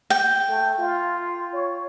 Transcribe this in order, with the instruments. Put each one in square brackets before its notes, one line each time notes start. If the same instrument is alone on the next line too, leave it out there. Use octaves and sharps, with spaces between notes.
[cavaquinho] G5
[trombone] A3
F4
C#5